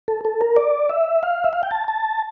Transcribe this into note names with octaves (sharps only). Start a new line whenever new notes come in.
A4
A4
A#4
D5
E5
F5
E5
F5
G5
A5
A5